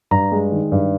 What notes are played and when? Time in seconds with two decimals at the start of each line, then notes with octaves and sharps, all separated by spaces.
0.11 G2 A#5
0.32 G#3
0.52 D#3
0.72 G2